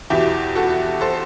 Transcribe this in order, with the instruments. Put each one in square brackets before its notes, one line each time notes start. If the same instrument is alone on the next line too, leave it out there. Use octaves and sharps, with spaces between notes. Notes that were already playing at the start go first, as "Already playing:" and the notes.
[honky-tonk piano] E2 B2 E4 G4
F#4 A4
A4 C5